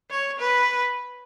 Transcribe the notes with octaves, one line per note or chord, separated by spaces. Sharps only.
C#5
B4